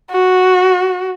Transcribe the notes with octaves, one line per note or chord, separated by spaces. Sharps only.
F#4